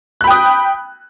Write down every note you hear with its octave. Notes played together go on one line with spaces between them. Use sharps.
G5 B5 D#6 F#6